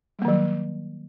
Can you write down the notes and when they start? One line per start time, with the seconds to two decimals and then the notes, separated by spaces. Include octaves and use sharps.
0.19 G3
0.22 A#3
0.25 D#3
0.28 F#3